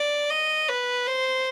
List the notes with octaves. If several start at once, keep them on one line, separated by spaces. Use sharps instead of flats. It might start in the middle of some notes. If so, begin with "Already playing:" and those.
Already playing: D5
D#5
B4
C5